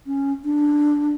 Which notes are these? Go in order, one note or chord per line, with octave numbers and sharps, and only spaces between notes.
C#4
D4